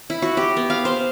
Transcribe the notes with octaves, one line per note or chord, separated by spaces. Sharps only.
E4
F#4
G4
B3
F5
C5